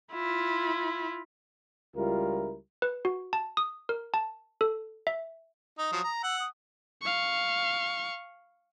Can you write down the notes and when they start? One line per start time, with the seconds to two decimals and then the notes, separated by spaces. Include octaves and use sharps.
0.13 E4 F4
1.96 C#2 G3 E4 F4 A#4
2.82 B4
3.05 F#4
3.33 A5
3.57 D#6
3.89 A#4
4.14 A5
4.61 A4
5.07 E5
5.78 D#4 D#6
5.92 F3 F#3
6.04 A#5
6.23 F#5 E6
6.40 D#6
7.02 F5 C#6